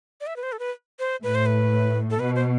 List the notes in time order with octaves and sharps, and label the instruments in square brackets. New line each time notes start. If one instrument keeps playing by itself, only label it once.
[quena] D5
E5
B4
C5
A4
B4
C5
[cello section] A2 [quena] B4
[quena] C5
B4
A4
[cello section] B2 [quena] B4
[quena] C5